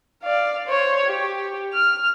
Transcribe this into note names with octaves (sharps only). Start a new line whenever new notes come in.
D5 F5
C5 C#5
G4
F6